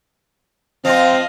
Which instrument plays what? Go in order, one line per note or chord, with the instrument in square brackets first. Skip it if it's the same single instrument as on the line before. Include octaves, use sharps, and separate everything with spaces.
[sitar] F3 F4 [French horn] C4 [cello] D#5 F5